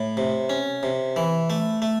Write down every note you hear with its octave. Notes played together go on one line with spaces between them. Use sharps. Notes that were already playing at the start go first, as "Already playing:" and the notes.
Already playing: A2
C3
C#4
C3
E3
A3
A3